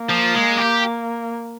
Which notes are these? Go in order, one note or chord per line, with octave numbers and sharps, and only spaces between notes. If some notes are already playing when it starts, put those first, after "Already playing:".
Already playing: A#3
F3
G#3
G4